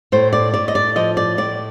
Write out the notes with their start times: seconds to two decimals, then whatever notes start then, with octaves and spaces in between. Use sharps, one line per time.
0.12 A2 C5
0.33 D5
0.54 A2 D5
0.68 D#5
0.75 D5
0.96 F3 D#5
1.17 D5
1.38 A2 D5